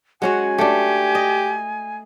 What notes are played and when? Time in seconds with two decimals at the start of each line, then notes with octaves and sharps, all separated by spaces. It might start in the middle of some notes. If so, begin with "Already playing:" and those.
0.22 G#3 C#4 F#4 F#5 G#5
0.58 A3 D4 G4
1.15 D#5